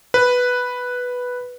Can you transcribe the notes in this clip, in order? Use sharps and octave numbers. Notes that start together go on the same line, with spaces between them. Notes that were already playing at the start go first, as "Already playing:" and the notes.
B4